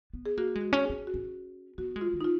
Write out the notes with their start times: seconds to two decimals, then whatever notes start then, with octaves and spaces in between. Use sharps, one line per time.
0.13 B3
0.26 G#4
0.37 A#3 F#4
0.55 G#3
0.61 F#4
0.73 C#4
0.85 G#4
0.90 C#4
1.07 F#4
1.14 C#4
1.78 B3 F#4
1.96 G#3
2.01 F4
2.13 D#3
2.21 D#4
2.24 F4